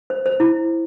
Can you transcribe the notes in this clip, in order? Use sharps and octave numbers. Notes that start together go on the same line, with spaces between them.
C5
C5
E4